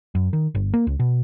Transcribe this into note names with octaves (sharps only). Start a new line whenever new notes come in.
F#2
D#3
G1
A#3
C#2
B2